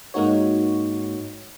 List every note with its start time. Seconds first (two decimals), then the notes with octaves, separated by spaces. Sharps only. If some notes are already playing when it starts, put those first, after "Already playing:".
0.14 G#2 G#3 A#3 D#4 F#4 C#5